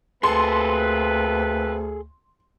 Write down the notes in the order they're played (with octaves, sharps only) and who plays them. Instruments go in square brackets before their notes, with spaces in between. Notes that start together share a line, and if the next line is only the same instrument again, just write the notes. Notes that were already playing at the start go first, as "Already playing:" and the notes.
[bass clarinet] D2 [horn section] A#3 C4 B4 [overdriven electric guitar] G#4 A4 [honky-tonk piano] C6